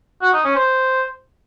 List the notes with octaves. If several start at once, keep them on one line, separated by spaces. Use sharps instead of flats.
F#4
D#4
C#4
C5